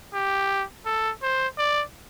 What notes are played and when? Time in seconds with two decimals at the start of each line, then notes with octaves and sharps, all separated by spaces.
0.14 G4
0.86 A4
1.22 C5
1.58 D5